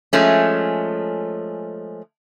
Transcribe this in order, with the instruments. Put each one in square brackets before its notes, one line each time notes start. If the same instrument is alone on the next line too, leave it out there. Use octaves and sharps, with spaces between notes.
[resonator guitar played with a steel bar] F3 G#3 A3 C#4